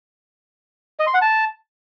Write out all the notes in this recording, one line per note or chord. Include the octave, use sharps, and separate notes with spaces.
D#5
C6
F#5
A5